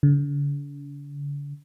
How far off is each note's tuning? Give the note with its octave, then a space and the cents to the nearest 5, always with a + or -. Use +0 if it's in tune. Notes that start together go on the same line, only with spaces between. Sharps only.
D3 -45